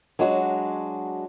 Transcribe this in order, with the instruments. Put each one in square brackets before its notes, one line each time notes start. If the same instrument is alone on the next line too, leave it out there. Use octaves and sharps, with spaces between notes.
[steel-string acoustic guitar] F#3 G#3 D4 F#4